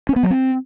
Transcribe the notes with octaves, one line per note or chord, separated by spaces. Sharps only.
C#4
B3
F#3
C4